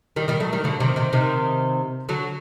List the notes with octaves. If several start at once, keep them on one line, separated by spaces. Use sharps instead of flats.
D#3 G3
D#3 G3
F#3 A3
D#3 G3
D3 F#3
C3 D#3
C3 D#3
C3 D#3
D3 F#3